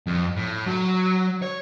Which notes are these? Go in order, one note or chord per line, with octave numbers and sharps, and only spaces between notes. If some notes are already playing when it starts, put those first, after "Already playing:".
F2
A2
F#3
C#5